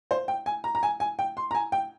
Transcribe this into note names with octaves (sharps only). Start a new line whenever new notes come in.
C5
G5
G#5
A#5
A#5
G#5
G#5
G5
C6
A#5
G#5
G5